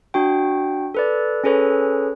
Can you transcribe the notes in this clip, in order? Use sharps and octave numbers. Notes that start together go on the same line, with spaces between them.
D4 F#4 G5
A4 B4 D5
C#4 G#4 A4 B4 C#5